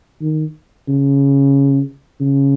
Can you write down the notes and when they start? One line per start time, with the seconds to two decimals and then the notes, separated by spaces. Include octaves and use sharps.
0.21 D#3
0.88 C#3
2.20 C#3